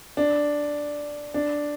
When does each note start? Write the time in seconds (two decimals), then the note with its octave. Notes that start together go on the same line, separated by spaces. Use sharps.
0.17 D4
1.34 D4